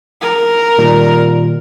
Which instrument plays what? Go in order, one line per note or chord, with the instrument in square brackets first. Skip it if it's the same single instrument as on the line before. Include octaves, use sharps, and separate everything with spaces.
[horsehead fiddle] A#4
[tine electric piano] A#2 D#3 G3